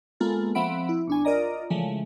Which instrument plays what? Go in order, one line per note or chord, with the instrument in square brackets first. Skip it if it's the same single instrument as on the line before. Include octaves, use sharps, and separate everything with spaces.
[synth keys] G#3 A#3 B3 F4 A4
F3 C4 E5 F#5 B5 D7
E4
B1 D4 G#5
F4 A#4 D5 D#5 A#5
C#3 E3 F3 G#3 A3